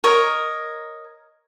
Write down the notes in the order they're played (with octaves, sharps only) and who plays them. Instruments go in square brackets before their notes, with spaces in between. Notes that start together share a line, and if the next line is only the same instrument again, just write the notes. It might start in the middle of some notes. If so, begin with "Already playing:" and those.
[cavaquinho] A#4 C#5 D#5